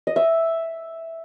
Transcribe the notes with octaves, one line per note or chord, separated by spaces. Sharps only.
D#5
E5